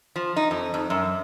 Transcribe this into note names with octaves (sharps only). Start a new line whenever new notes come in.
F3
D#4
F2
F2
F#2